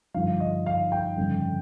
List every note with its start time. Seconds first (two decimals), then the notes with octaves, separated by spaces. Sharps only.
0.14 G1 G2 F3 F5
0.40 D#5
0.66 F5
0.92 G5
1.17 G1 F2 C#3